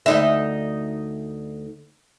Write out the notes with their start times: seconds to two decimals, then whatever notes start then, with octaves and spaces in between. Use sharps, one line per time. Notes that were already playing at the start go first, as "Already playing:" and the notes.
0.06 D2 D#4 E5